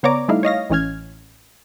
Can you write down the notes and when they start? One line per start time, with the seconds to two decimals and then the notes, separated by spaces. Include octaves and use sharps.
0.03 C#3 B3 C#5 D5 A#5 D6
0.28 G3 A3 D#4 E4 F5
0.43 C#5 D#5 F5 A#6
0.70 A1 E3 C#4 F6 G#6